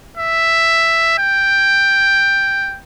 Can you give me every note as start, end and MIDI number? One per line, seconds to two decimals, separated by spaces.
0.17 1.17 76
1.19 2.78 79